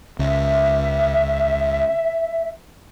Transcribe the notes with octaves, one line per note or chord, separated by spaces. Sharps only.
C#2 E5